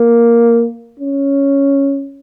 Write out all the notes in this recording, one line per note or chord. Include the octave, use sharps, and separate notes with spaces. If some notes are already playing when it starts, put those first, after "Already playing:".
Already playing: A#3
C#4